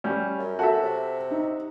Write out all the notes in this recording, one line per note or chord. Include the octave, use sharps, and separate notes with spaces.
G3 C#4 G6
F#2
F#4 A4 E5 A5
C3
D#4